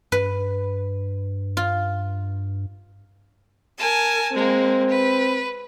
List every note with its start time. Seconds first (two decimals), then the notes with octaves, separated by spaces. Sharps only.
0.12 G2 B4
1.57 F4
3.77 A#4 G#5 A5
4.32 G#3 A#3 C4
4.89 B4